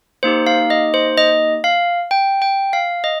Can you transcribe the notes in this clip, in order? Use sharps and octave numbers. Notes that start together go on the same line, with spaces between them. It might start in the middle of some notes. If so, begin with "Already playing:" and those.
A#3 D#4 G4 C5
F5
D#5
C5
D#5
F5
G5
G5
F5
D#5